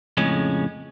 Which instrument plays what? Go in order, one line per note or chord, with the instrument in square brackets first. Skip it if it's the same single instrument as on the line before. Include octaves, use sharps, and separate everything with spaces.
[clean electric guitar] F2 A2 C#3 G#3 C#4